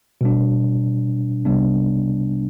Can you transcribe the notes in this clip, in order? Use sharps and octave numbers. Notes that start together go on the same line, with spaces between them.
B2 G3 D4
C2 C3 G3 B3 D4